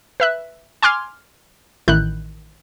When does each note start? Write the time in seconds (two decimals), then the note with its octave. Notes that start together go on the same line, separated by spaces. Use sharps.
0.20 B4 E5 F#6
0.82 G#5 C6 D6 F6 G#6
1.88 A1 D#3 E4 F#6 G6